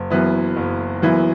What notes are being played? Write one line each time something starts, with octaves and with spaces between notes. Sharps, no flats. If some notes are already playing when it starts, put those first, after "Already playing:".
Already playing: F#1
F#2 E3 B3 E4
F#1
F#2 E3 B3 E4